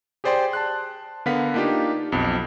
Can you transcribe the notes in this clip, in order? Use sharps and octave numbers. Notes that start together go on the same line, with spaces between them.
G4 G#4 C5 D5 G5 C6
A5 C6 F#6
D3 B3 A#4 F5 F#5 B6
A#3 D4 D#4 F4 G4
B1 F2